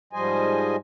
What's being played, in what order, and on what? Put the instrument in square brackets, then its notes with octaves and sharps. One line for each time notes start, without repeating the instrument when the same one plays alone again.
[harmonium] G#2 F3 G3 C5 D#5 G#5